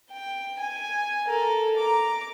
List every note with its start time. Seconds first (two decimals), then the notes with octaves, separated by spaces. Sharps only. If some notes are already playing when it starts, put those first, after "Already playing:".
0.11 G5
0.60 G#5
1.26 A4 A#4
1.78 A#5 D6